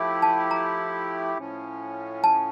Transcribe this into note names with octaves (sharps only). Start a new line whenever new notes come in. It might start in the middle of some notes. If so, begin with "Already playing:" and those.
Already playing: F3 A3 E4 G4
A5
A#5
A2 F3 C#4
A5